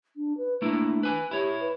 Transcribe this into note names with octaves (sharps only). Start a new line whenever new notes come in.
D4
B4
A3 A#3 D4 E4
B4 G#5
E4 G4 C#5
B4